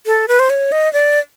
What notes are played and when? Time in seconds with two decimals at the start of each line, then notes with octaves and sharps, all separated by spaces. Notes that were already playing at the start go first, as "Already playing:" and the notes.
0.06 A4
0.28 B4
0.39 C5
0.50 C#5
0.72 D#5
0.93 D5